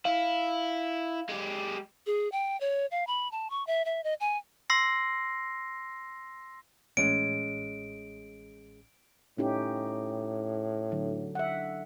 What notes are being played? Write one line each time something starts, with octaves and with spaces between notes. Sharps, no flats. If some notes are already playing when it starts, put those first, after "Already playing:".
E4 F5
G#3 G4
G#4
G5
C#5
F5
B5
A5
C#6
E5
E5
D#5
G#5
C6 E6 A#6 C7
A1 G#3 C#4 D7
A2 C#4 D#4 G4
D3 F#3
E5 F#5